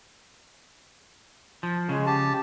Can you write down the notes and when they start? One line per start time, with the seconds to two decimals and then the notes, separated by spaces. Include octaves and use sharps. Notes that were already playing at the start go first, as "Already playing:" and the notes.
1.63 F3
1.89 C#3 G#3
2.06 G4 A5